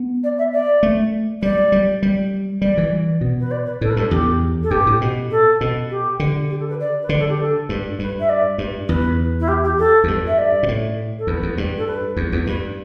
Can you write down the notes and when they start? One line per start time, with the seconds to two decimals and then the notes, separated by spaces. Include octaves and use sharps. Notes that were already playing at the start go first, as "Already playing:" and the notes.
Already playing: B3
0.24 D5
0.38 E5
0.53 D5
0.83 A3
1.42 G3 D5
1.72 G3
2.03 G3
2.62 G3 D5
2.77 E3
3.21 B2
3.40 B4
3.51 D5
3.66 B4
3.81 A2 A4
3.90 B4
3.97 G2 A4
4.11 E2 G4
4.63 A4
4.71 G2 G4
4.86 A2
5.01 B2
5.31 A4
5.61 B2
5.90 G4
6.20 D3
6.50 G4
6.59 A4
6.69 B4
6.80 D5
7.02 B4
7.09 D3 D5
7.19 A4
7.29 G4
7.39 A4
7.69 G2
7.99 G2 B4
8.20 E5
8.29 D5
8.58 G2
8.89 E2 B4
9.40 E4
9.48 G4
9.63 G4
9.79 A4
10.04 E2
10.08 G2
10.27 E5
10.38 D5
10.63 B2
10.68 A2
11.19 A4
11.27 E2 B4
11.43 E2
11.58 G2
11.77 A4
11.87 B4
12.17 E2
12.32 E2
12.46 G2 B4